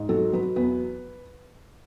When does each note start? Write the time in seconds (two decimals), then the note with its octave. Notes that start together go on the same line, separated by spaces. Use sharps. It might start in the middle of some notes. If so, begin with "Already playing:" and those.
Already playing: G#2
0.09 F#3 A4
0.33 F#3 B4
0.56 E2 B4